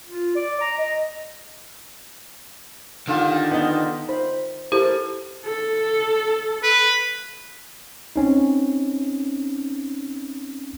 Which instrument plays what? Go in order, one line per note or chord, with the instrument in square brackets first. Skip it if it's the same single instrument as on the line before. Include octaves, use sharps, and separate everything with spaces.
[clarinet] F4
D5
A#5
D#5
[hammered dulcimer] D3 F4 G4 [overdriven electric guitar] D#3
[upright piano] B3 D#4
[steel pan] D#4 C5 B5
[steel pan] E4 A4 A#4 [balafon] G4 C5
[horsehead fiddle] A4
[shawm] B4
[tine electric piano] C4 C#4 D#4